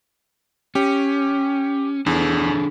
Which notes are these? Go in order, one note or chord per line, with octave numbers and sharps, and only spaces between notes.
C#4 G4
E2 D4 G#4 A4